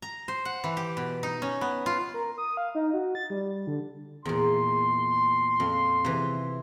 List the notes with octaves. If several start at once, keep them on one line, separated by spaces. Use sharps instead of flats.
A#5
C5
F#5
E3
G4
B2
D#4
C#4
B3
F4
A#4
D#6
F5
D#4
F#4
A6
G3
D3
E2 A#2 C6
F2
C3 E3